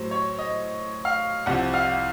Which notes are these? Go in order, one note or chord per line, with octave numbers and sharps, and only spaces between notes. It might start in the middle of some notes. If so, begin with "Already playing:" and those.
Already playing: A2 F#3 C5
C#5
D#5
F5
C2 C3 F3 F#5
F5